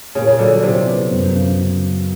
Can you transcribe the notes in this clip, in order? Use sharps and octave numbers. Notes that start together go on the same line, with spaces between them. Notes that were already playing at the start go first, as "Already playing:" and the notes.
A#2 C#3
C#3
D3 F#3
C3 E4
B3
F#2
C#3